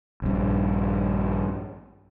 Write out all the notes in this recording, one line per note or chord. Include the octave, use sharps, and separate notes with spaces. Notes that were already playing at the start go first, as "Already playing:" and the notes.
A#1 G2